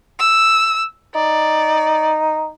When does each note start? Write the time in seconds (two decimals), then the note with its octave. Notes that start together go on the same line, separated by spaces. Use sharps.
0.19 E6
1.15 D#4 D5